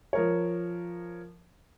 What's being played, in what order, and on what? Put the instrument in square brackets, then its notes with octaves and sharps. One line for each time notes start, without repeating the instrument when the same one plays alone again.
[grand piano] F3 A#4 C#5